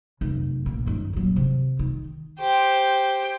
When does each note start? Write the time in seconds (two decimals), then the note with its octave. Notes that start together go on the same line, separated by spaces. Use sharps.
0.21 F1 F#2
0.66 A#1 A#3
0.86 F#2 D#3
1.13 D#1 F#3
1.36 C3
1.79 D#3
2.40 G4 C5